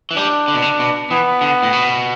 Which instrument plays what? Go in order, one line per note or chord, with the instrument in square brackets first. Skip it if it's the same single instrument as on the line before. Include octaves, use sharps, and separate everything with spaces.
[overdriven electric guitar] E3
[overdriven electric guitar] G3 [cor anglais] D4
[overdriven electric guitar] D3
B2
D3
B2
[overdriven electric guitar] E3 [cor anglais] B3
[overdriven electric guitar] D3
A2
B2